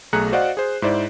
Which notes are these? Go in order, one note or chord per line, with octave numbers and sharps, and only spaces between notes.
B1 A3 G#4 A#5 F#6 C#7
F#4 C5 D5 D#5 F5 F#5
G#4 C5
G#2 E4 C5 D5